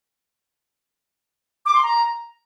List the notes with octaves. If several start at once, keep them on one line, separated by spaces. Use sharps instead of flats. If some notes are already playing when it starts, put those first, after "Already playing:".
D6
C6
A#5